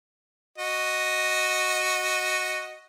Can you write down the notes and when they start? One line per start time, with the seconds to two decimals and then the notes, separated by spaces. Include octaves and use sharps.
0.58 F#4 D#5